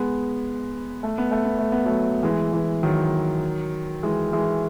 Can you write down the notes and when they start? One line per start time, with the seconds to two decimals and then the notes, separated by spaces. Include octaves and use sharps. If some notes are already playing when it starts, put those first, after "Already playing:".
Already playing: G#3 B3
1.03 A3
1.18 B3
1.31 A3
1.45 B3
1.59 A3
1.72 B3
1.85 F#3 A3
2.23 E3 G#3
2.53 E3
2.83 D#3 F#3
4.03 E3 G#3
4.33 E3 G#3